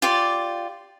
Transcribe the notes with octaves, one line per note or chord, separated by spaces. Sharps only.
F4 G4 D5